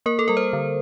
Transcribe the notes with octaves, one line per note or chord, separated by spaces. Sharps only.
A#3 A#4
A4
G3 A#4
C5
D3